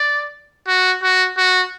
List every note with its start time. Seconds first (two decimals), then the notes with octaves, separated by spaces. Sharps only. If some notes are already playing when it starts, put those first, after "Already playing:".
Already playing: D5
0.68 F#4
1.03 F#4
1.38 F#4